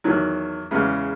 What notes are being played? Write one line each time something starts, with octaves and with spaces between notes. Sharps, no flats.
E2 D#3 F#3
E2 C#3 G#3 B3